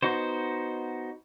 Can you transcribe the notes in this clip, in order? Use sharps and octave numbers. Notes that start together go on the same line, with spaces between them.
B3 D#4 F#4 C5